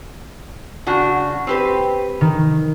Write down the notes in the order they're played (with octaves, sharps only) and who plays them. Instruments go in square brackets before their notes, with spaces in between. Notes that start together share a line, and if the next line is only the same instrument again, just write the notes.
[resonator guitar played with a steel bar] C#3 D4 F#4
C4 G4 B4
[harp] D#3